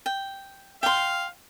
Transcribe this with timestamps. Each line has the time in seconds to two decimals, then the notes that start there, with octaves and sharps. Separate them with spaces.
0.06 G5
0.83 F5 G5 C6